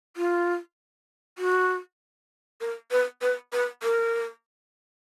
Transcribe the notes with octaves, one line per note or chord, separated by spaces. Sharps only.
F4
F#4
A#4
B4
B4
B4
A#4